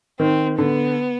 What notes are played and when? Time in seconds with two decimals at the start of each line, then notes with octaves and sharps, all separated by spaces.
0.20 D#3 C4
0.58 D3 B3